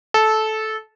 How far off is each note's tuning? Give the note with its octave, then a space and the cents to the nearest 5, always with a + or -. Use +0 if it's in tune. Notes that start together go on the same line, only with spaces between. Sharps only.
A4 -15